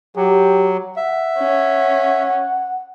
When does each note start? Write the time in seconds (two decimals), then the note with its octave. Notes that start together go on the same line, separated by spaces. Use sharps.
0.16 F#3 G4
0.97 E5 F#5
1.39 C#4